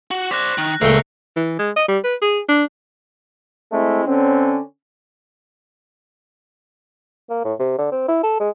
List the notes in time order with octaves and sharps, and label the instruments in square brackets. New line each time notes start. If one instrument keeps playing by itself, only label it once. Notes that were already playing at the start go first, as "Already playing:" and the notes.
[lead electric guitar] F#4
[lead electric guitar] C5 D5 [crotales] F#6 A#6 B6
[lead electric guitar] D#3
[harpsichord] C#2 A#2 G5 [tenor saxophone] A3 [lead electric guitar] A#4 E5 [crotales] C7 C#7
[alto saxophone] E3
G#3
D#5
G3
B4
G#4
D4
[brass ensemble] G#3 A3 C4 E4
D3 C4 C#4
[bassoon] A#3
A2
C3
D3
C4
E4
A4
G#3